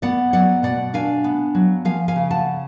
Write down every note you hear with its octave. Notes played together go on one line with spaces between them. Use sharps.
B3 D5 F#5
F#3 D5 F#5
B2 D5 F#5
D4 F5 G#5
B3
F#3
F3 F5 G#5
F5 G#5
C#3
F#5 A5